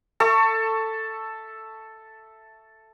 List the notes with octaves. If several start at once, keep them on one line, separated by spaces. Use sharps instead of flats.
A4 E5 C#6